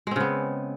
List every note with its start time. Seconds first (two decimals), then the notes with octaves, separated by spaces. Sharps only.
0.07 G#3
0.11 C4
0.16 C#3
0.20 B3